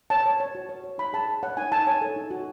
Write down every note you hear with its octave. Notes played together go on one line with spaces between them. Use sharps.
C#5 A5
C#5
C#5
F#4
C#5
C#5
D#4 B5
G#4 A5
G#4
C#5 F#5
D#4 G#5
D#4 A5
C#5 G#5
A4
D#4
F#4